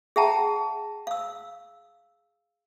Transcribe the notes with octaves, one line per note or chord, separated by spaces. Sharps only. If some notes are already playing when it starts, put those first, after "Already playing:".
G#4 E5 F#5 G5 A5 A#5
F5 E6